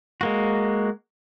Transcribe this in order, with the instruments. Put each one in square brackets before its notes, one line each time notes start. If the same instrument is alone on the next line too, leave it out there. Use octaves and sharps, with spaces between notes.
[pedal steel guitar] G#3 A#3 F#4